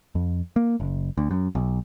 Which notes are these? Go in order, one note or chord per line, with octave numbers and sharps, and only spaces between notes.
F2
A#3
F#1
D2
F#2
B1